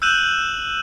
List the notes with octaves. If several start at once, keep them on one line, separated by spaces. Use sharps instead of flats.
E6 F#6 G6 D#7 E7 F#7